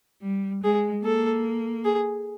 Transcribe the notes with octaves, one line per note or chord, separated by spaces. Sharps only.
G3
G#3 G#4
A#3 A4
G#4